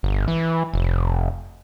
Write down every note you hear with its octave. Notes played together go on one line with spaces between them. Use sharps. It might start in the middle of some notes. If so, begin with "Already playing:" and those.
G1
E3
F1